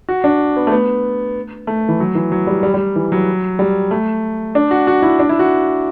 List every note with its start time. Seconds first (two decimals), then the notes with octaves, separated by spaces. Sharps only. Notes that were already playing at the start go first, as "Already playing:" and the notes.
0.09 F#4
0.24 D4
0.56 B3
0.67 A3
0.71 B3
1.67 A3
1.89 E3
2.00 F#3
2.15 E3
2.32 F#3
2.47 G3
2.63 G3
2.74 G3
2.96 E3
3.12 F#3
3.59 G3
3.91 A3
4.55 D4
4.71 F#4
4.87 F#4
5.02 E4
5.19 D4
5.29 E4
5.39 F#4